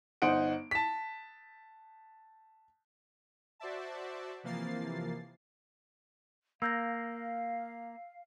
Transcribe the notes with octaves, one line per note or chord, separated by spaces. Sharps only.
G1 D#4 C5 F#5 D7
A5 B6
F#4 C5 D5 E5 A5
C3 E3 F3 A#3 A6 C7
A#3 F5 E6 G6 A#6